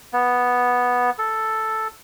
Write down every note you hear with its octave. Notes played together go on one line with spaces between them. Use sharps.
B3
A4